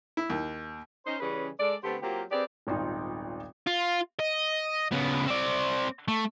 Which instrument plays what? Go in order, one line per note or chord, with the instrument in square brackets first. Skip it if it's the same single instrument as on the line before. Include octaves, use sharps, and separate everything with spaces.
[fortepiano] E4
D#2
[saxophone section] C#4 D#4 C5
C#3 E3 G3 C#4 G#4 B4
G#3 A4 D5
D3 A3 B3 C4 G4 C5
F#3 A#3 C4 F4 G4
C4 G4 G#4 B4 D5
[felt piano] D#1 G#1 D#4 F4
[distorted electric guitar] F4
D#5
C#3 B3
C4 D5
A3